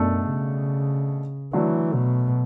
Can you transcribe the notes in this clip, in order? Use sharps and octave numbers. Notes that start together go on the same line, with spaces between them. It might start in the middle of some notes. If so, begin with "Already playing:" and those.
Already playing: F#2 B2 A3 D4 A4
C#3
D3 E3 F#3 A3
B2